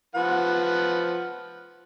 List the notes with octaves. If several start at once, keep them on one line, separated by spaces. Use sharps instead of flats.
F3 B4 F#5